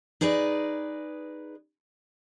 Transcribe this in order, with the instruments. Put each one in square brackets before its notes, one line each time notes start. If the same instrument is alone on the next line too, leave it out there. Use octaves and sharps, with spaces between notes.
[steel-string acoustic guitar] D#4 G#4 B4 D5